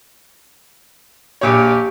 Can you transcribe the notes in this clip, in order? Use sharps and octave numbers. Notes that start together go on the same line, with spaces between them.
A#1 A#2 G4 C#5